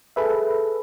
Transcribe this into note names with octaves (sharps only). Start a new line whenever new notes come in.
G#4 A4 B4 E5